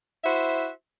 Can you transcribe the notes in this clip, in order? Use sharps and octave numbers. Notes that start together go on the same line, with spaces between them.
E4 F#4 C5 E5